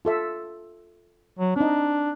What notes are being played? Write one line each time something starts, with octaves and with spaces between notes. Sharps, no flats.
F4 A4 E5
F#3
C4 D4 D#4